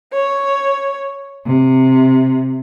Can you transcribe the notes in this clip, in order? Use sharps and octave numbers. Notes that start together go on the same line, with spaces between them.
C#5
C3